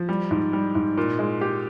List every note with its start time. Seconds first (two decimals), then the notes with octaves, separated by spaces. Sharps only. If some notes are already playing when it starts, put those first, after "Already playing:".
Already playing: F3
0.09 G3
0.31 G#2
0.53 G3
0.75 G#2
0.98 A#2
1.19 G#3
1.41 G4